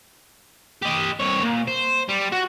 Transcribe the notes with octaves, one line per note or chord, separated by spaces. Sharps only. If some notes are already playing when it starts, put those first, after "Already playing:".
G4 D#5
C2 C#5
A#2
C5
G3
F#4